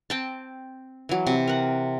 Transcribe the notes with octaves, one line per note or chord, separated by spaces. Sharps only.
C4 G5 A5
E3 F#3
C3
A#4 F#5